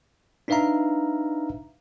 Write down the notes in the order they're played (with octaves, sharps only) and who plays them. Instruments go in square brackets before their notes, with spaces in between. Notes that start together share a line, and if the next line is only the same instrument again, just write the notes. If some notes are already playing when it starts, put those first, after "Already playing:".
[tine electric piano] D4 D#4 B4 E5 F5 A#5